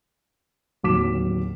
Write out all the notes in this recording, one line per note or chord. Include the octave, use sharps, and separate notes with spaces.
D1 D#2 F#3 D6 B6 E7